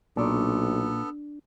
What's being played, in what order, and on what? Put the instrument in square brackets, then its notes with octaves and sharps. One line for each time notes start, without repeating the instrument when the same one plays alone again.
[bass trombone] B1 [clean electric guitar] A#2 [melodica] B3 A4 [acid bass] D4